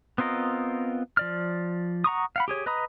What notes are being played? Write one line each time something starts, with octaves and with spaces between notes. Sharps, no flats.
B3 C4 F4 A#4 D#5
F3 D5 F6
F#5 A#5 C#6 D#6
F5 F#5 B5
G4 G#4 C#5
B4 D#5 A#5 B5 D#6